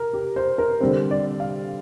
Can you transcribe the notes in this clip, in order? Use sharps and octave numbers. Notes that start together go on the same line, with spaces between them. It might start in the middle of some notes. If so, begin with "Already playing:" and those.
Already playing: A#4
G4
C5
A#4
D3 G3 C4 C5
D5
F5